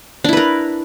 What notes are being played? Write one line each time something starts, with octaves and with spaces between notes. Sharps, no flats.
D4 E4 A#4 B4